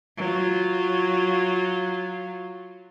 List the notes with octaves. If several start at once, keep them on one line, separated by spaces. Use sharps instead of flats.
F#3 F4